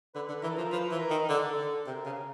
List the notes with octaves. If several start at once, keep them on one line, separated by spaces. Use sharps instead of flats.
D3 B4
D3
E3 A#4
A4
F3 A#4
F3 B4
E3
A#4
D#3
D3 A4
D3
C3 A#4
C#3